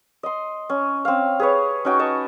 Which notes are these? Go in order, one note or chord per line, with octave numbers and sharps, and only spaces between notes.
D#5 C6
C#4
C4 F5
G#4 B4 C#5
C#4 D#4 F#4 G5
D#5 A5 C#6